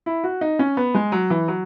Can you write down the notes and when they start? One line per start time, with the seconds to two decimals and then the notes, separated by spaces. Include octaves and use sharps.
0.06 E4
0.24 F#4
0.41 D#4
0.59 C#4
0.77 B3
0.94 G#3
1.12 F#3
1.30 E3
1.48 F#3